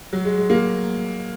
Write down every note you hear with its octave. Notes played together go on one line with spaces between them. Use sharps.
F#3
G#3
G#3
A#3